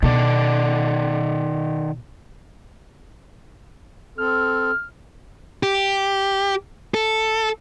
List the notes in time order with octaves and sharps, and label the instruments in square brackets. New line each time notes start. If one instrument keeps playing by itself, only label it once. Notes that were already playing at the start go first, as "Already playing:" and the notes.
[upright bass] B2 [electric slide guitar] D#3 A4 D5
[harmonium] C4 A4 [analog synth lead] F6
[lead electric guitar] G4
A4